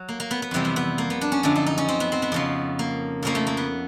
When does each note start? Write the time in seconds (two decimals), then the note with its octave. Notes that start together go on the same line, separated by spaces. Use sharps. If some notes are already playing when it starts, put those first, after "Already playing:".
Already playing: F#3
0.09 A#3
0.20 A#3
0.31 B3
0.42 B3
0.51 F2 C3 E3 G3 C4
0.65 B3
0.76 B3
0.98 A#3
1.10 B3
1.21 D4
1.32 C#4
1.43 F#2 D3 F3 D4
1.56 D#4
1.66 D#4
1.78 C#4
1.89 C4
2.00 B3
2.12 C4
2.22 B3
2.32 F2 C#3 F3
2.79 A#3
3.23 F2 C#3 F3 A#3
3.35 A3
3.47 A#3
3.57 B3